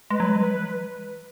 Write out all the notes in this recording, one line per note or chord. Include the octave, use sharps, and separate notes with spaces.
G#3 B4
F#3
G#3
F#3 B4
E3